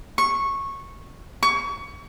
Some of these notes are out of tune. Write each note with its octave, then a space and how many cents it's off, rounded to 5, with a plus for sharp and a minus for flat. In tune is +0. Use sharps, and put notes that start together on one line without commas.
C#6 -15
C#6 +20